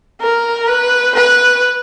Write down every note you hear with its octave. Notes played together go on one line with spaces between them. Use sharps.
A#4
B4
B4